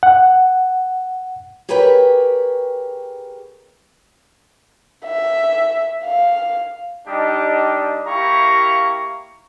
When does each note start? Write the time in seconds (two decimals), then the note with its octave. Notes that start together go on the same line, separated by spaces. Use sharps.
0.03 F#5
1.69 G4 G#4 A#4 B4 C#5 G5
5.05 E5
6.04 F5
7.07 G3 D4 D#4 G4 D#5
8.06 A#3 E4 G4 F5 A#5 C#6